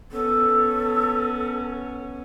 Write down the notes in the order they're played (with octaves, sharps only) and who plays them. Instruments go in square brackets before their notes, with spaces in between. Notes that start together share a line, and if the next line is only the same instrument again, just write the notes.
[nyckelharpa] B3 C#4 [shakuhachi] A4